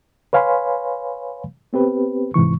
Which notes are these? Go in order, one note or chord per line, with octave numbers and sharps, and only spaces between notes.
B4 C#5 F5 G#5 B5 C6
B3 C4 G4 B4
G#2 C3 E3 C#6